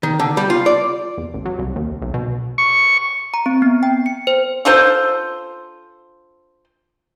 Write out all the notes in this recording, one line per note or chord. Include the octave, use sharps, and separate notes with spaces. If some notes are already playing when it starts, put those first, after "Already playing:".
D#3
D3
G3
F4
D5
E2
A1
F#3
C2
D#2
B1
B2
C#6
A#5
C4
B3
G5
C#7
C5
D4 F4 A4 C5